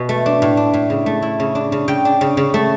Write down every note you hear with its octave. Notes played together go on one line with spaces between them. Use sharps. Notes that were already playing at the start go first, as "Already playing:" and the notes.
Already playing: B2
A3
D4
A2
D4
A2
C#3
A3
E4
C#3
D4
C#3
C#3 G5
D4
C#3
C#3
A3